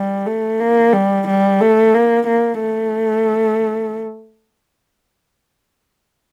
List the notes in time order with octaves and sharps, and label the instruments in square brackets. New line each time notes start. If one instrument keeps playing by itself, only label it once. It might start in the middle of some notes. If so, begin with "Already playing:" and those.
Already playing: [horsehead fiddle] G3
A3
A#3
G3
G3
A3
A#3
A#3
A3